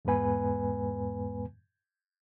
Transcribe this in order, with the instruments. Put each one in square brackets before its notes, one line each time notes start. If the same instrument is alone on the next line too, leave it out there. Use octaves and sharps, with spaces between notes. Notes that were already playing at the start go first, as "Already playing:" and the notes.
[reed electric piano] E2 G#2 G#3 B3 B4 G#5